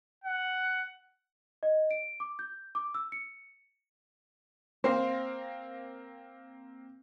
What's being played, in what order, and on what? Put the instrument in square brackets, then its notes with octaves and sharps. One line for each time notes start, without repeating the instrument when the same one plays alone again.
[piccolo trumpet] F#5
[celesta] D#5
D7
D6
G6
D6
E6
C#7
[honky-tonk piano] A#3 C4 F5 [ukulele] C5